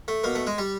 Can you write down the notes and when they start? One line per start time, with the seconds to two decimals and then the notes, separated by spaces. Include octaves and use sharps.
0.08 A3
0.24 B2 A#3
0.35 A3
0.47 G#3
0.58 G3